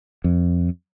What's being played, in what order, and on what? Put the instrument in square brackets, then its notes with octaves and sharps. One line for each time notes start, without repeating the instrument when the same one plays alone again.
[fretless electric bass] F2